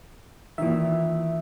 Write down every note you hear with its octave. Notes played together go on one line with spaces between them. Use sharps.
A#2 D#3 E3 E5